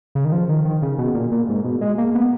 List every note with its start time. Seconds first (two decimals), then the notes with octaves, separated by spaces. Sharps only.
0.15 C#3
0.25 D#3
0.32 F3
0.49 D#3
0.65 D#3
0.82 C#3
0.98 B2
1.15 A#2
1.32 A#2
1.49 G#2
1.64 B2
1.81 G#3
1.98 A#3
2.15 B3